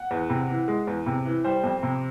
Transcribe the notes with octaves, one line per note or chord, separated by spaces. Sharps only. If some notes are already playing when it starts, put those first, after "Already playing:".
Already playing: F#5
E2
C3
E3
G#3
E2
C3
E3
G3 C5
F2
C3